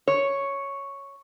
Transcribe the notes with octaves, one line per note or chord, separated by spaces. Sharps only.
C#5